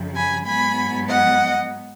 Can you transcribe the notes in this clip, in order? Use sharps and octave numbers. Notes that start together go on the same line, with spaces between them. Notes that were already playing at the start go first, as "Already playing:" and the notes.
Already playing: F#2 C#3 F3
G#5 B5
G#2 F#3 B3 G#5 B5
D#5 F#5